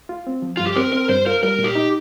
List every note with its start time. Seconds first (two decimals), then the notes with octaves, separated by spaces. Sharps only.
0.09 F4
0.27 C4
0.42 F3
0.57 G2 F4
0.67 G4
0.76 C4 A#4
0.92 C4 A#4
1.09 G2 C5
1.26 F4 A#4
1.43 G3 A#4
1.59 A#2
1.64 G4
1.75 D#4